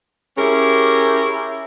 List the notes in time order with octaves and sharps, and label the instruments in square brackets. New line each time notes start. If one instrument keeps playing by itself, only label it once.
[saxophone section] C#4 E4 G4 G#4 A#4